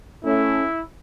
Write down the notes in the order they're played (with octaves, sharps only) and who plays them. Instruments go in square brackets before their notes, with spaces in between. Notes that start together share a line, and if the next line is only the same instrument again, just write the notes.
[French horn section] A3 C#4 [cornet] E4